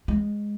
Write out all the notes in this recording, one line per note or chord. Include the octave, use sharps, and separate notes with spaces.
G#3